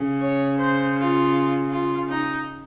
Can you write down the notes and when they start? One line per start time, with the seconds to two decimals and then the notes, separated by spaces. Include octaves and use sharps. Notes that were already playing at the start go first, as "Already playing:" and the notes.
Already playing: C#3
0.21 C#5
0.58 C5
0.97 F4
1.70 F4
2.09 D#4